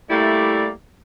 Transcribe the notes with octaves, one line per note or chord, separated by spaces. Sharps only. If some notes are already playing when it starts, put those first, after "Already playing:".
G3 A3 A#3 E4 D5